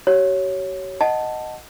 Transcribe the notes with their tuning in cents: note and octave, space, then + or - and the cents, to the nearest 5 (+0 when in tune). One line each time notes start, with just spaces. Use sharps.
G4 -45 C#5 +0
D#5 +0 F#5 +0 A5 +0